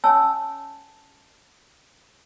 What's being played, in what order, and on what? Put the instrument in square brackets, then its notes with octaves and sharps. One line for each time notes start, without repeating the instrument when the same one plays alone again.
[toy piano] C#4 C#5 G#5 A5 E6